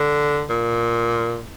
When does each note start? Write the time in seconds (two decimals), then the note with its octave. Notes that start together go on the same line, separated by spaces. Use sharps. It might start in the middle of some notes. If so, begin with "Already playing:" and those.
Already playing: D3
0.50 A#2